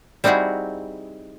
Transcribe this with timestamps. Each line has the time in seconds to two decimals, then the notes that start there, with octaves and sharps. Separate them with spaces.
0.24 G3 C4 D#4 E4 F#4 G#4